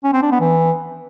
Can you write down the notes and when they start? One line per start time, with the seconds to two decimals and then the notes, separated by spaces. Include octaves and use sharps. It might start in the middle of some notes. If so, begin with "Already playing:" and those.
0.04 C#4
0.13 C4
0.22 D4
0.31 B3
0.40 E3